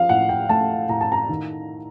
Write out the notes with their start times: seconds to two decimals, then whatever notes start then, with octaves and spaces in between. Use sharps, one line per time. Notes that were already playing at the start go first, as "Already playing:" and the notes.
Already playing: F3 F5
0.09 A2 F#5
0.29 G5
0.49 A3 A5
0.89 A2 A#5
1.01 A5
1.12 A#5
1.29 D#3